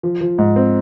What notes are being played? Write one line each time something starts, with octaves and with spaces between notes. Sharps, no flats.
F3
F3
G#2
C4